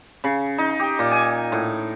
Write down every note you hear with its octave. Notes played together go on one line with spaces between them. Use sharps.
C#3
D#4
G4
A#2
G#5
A2